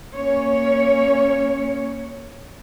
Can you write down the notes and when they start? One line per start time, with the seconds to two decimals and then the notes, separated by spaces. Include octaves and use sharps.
0.14 A#3 C#4 C#5